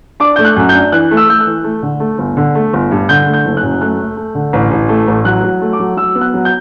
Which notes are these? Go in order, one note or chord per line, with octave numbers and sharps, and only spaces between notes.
D4 D6
A3 G6
F#6
F#2
G6
D4
E3 F#6
A3
E6
A3 G6
F#6
E3
A3
D3
A3
G1
D3
A3
G1
G2
D3 G6
A3
G6
F#1
F#6
F#2
A3 F#6
A3
A3
D3
A1
A1
A3
A1
F#3 F#6
F#3
A3
D6
F#3
F#3 E6
B3
F#6
F#3
G6